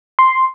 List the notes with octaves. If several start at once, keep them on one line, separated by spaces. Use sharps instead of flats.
C6